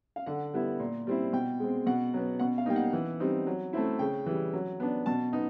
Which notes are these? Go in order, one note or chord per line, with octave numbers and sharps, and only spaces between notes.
F5
D3 F#5
G3 B3 E4
A#2
G3 C4 E4
B2 G5
G#3 C4
B2 F#5
F#3 B3
B2 F#5
F5
G3 A#3 D#4 G5
F#5
E3
G3 C4 D#4
F#3
A3 C4 E4
C#3 G5
E3 G3
F#3
B3 D4
B2 A5
B3 D#4